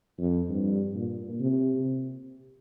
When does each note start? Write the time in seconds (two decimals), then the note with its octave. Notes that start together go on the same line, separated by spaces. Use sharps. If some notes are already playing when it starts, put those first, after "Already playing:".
0.18 F2
0.49 G2
0.95 A#2
1.40 C3